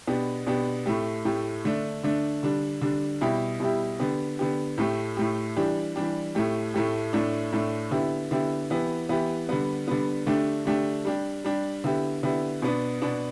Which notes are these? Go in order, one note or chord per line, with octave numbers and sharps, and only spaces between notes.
B2 B3 D4 G4
B2 B3 D4 G4
A2 A3 G4
A2 A3 G4
D3 A3 D4
D3 A3 D4
D3 G3 D4
D3 G3 D4
B2 G3 E4 G4
B2 G3 E4 G4
D3 B3 G4
D3 B3 G4
A2 A3 G4
A2 A3 G4
E3 G3 D4 G4
E3 G3 D4 G4
A2 A3 G4
A2 A3 G4
A2 A3 D4
A2 A3 D4
D3 B3 E4 G4
D3 B3 E4 G4
E3 B3 E4 G4
E3 B3 E4 G4
D3 G3 B3
D3 G3 B3
D3 A3 D4 G4
D3 A3 D4 G4
G3 D4 G4
G3 D4 G4
D3 B3 E4 G4
D3 B3 E4 G4
B2 B3 D4
B2 B3 D4